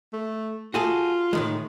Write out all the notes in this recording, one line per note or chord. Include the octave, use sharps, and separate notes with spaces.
A3
F4 F#4 G#4 A4
A2 D#3 G#3